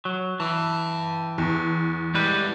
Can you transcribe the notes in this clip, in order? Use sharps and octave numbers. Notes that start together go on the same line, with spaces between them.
F#3
E3 G5 A5
E2
G3 G#3 E4 B4